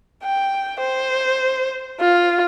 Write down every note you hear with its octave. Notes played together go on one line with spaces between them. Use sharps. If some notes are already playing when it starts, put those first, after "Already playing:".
G5
C5
F4